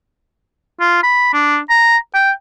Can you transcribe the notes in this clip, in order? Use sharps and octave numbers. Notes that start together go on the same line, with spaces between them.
F4
B5
D4
A#5
G5